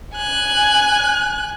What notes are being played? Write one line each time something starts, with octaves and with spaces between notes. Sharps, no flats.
G#5 F#6